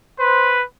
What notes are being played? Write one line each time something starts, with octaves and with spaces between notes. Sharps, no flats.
B4 C5